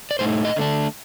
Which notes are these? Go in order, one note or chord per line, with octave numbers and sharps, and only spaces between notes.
D5
A2 A3 D#4 C5
D#5
D3 A3 D4